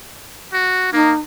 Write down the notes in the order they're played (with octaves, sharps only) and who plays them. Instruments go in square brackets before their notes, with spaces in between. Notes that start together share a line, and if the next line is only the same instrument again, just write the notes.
[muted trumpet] F#4
[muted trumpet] A#3 [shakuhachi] D#4